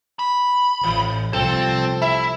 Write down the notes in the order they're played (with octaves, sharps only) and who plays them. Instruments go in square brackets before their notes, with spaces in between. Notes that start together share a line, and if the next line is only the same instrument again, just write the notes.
[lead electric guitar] B5
[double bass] A1 [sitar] E3
[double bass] C2 F3 [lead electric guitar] C4 C5 [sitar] A4
[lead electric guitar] E4 [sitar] E5